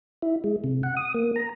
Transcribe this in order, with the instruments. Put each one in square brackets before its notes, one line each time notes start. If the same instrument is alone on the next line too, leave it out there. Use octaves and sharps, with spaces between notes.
[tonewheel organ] E4
G#3
C3
F#5
D#6
A#3
A#5